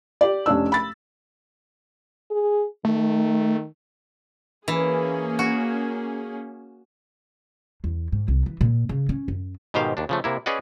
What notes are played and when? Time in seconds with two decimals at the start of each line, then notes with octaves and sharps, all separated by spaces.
0.21 G4 D5
0.46 F1 C#4 D4 E6
0.72 B5 A6
2.31 G#4
2.85 D#3 A3
4.68 E3 A#3 C#4 G#4
5.39 F#4
7.84 E2
8.12 G#2
8.28 C2
8.46 E3
8.61 A#2
8.89 C#3
9.09 C#4
9.28 F#2
9.74 G#2 B2 D#3 G4 C5 F5
9.97 D#2 D4
10.09 C#3 F3 A3
10.24 C3 A#3 E4
10.46 C#4 G#4 B4 D5 D#5 F#5